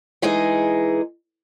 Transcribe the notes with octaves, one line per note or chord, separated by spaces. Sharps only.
E3 G#3 D#4 G#4